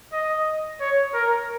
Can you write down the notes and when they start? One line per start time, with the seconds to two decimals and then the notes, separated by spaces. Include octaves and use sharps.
0.13 D#5
0.80 C#5
1.14 A#4